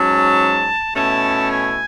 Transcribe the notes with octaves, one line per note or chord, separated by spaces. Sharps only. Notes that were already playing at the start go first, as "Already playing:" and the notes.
Already playing: G#2 F#3 C#4 A5
B2 A3 C#4 E4 A5
G#5